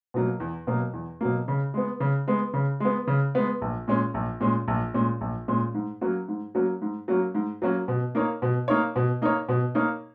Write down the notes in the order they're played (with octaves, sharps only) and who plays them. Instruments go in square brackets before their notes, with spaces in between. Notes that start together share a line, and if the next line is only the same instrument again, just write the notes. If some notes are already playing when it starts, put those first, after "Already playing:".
[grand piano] B2 F#3 A#3
E2
B2 F#3 A#3
E2
B2 F#3 A#3
C#3
G#3 B3
C#3
G#3 B3
C#3
G#3 B3
C#3
G#3 B3
A#1
A#2 G#3 C#4
A#1
A#2 G#3 C#4
A#1
A#2 G#3 C#4
A#1
A#2 G#3 C#4
G#2
F#3 A#3 C#4 F#4
G#2
F#3 A#3 C#4 F#4
G#2
F#3 A#3 C#4 F#4
G#2
F#3 A#3 C#4 F#4
B2
A#3 D#4 A#4 C#5
B2
A#3 D#4 A#4 C#5
B2
A#3 D#4 A#4 C#5
B2
A#3 D#4 A#4 C#5